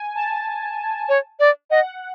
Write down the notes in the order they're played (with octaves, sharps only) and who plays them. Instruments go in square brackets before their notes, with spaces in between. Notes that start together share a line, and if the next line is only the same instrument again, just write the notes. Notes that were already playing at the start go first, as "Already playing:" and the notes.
Already playing: [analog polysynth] G#5
A5
[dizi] C#5
D5
[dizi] D#5 [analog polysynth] F#5